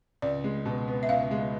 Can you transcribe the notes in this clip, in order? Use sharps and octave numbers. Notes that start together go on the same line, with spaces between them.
C#2 D5
G#3
B2
B3
E5
C#2 F5
G#3